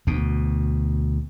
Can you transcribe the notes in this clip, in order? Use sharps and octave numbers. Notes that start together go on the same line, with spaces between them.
D2 B2